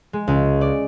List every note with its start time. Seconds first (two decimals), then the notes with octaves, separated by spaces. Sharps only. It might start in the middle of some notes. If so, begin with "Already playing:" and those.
0.13 G#3
0.28 C#2
0.61 D5